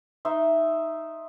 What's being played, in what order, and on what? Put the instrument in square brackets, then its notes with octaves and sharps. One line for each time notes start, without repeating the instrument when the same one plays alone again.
[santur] D#4 E5 C6